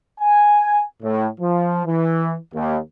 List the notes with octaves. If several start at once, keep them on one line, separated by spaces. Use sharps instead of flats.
G#5
A2
F3
E3
D#2